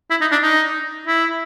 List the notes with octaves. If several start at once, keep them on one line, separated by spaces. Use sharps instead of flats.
E4
D#4
D4
D#4
E4